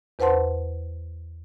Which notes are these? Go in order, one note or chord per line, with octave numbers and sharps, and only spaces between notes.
E2 B4 C5 F#5 A5 C6